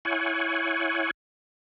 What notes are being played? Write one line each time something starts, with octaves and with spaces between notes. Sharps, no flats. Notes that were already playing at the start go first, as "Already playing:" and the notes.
E4 C#5 F#5 G#5